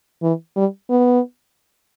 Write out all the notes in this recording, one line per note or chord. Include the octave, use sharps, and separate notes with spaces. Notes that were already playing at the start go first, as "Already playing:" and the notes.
E3
G3
B3